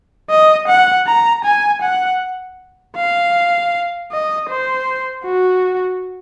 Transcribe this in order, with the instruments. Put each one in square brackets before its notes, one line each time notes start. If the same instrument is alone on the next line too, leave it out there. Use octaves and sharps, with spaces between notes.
[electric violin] D#5
F#5
A#5
G#5
F#5
F5
D#5
C5
F#4